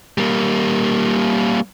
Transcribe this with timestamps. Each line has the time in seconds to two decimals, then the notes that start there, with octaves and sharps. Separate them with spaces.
0.18 G3 A#3